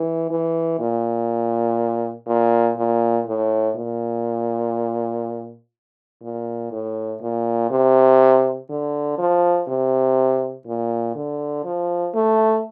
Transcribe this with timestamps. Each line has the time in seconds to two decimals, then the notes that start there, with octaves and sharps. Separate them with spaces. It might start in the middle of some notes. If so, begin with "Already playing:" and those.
Already playing: E3
0.30 E3
0.79 A#2
2.27 A#2
2.77 A#2
3.26 A2
3.76 A#2
6.22 A#2
6.72 A2
7.22 A#2
7.71 C3
8.70 D3
9.18 F3
9.68 C3
10.67 A#2
11.15 D3
11.64 F3
12.14 A3